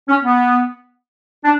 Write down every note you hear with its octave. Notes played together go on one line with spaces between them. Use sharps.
C#4
B3
D4